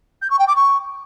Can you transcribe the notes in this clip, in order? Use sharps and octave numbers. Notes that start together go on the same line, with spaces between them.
G6
C#6
G5
D6
C#6